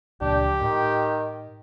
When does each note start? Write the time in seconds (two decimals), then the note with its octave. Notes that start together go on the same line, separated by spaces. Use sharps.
0.21 C#2 A#2 F3 D4 G4
0.61 A2 D#3